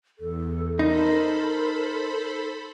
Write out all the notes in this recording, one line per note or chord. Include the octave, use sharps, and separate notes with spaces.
E2 A4
D#4 A4 A#4 C5 B5